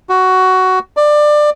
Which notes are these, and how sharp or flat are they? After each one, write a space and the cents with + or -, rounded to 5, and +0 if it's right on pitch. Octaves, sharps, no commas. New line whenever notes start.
F#4 +10
D5 +20